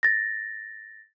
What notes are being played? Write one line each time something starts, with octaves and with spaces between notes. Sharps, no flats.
A6 A#6